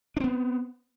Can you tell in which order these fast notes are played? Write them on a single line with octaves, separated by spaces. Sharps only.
D4 C4 B3